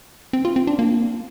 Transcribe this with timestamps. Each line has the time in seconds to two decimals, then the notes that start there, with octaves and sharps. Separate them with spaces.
0.33 C4
0.45 F4
0.56 C4
0.67 D4
0.79 A#3